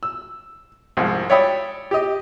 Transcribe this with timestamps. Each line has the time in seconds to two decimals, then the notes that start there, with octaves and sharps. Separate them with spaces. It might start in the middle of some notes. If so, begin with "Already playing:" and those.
0.03 E6
0.97 C2 G#2 F3 G#3
1.30 C#5 D5 E5 G5 B5 D#6
1.91 G4 D#5